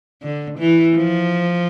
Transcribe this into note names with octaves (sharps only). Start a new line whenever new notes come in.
D3
E3
F3